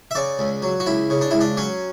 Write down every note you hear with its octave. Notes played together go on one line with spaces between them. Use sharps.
E5
C#3 D5
C#2
F#3
F#4
C#2 E4
C#3
D4
C#2 E4
D4
F#3 C#4